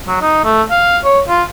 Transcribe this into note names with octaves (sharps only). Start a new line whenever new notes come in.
F#3
D#4
A3
F5
C#5
F4